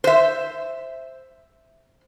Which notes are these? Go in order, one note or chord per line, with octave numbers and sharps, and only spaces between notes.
C5 E5